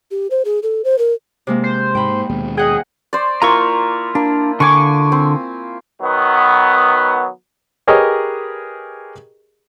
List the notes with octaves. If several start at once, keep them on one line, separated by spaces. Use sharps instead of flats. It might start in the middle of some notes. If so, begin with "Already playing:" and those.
G4
C5
G#4
A4
C5
A#4
C3 G#3 A#3
C5
G#2 G5 B5
D#2 B2 G#3
G#4 D#5 F#5 G5
C5 D5
A#3 E4 F4 A#5 C#6
A#3 D4
D3 G#5 C#6 D6
C4
D#3 F#3 B3
G4 G#4 A#4 B4 C#5 D#5